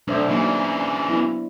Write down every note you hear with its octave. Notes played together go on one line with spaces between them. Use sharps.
B1 A3 D4 C5 E5
C#3 E3 F#3 A#3 D#4
F#3 B3 E4